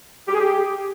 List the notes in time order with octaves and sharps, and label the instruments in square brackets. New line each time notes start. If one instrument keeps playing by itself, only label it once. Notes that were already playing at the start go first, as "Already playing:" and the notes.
[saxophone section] G4
G#4
G4